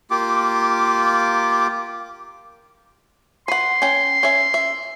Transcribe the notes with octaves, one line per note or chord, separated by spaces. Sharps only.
A#3 F4 G4 D6
B4 F#5 C6
C#4 G5
C#4 E5
E5